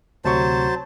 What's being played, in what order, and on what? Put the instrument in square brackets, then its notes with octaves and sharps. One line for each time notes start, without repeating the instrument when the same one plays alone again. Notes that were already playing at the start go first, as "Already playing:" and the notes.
[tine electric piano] D2 C3 C#6 [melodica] F#3 C5 A5